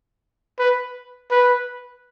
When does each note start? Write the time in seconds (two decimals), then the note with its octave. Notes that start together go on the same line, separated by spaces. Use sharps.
0.59 B4
1.31 B4